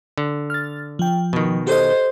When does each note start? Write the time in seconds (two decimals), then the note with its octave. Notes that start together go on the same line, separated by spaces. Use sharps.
0.18 D3
0.50 F6 A6
0.99 F3 G5
1.33 B2 D#3
1.67 G4 A4 C5 D#5